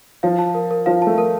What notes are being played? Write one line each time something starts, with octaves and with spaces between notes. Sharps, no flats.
F3 F5
A5
A#4
A#4
F3 F5
A3 A5
A#4